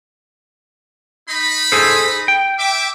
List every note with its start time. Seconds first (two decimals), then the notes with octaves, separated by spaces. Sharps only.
1.29 D#4 B5
1.72 G#4 A4 C5
2.28 G5
2.59 E5 D6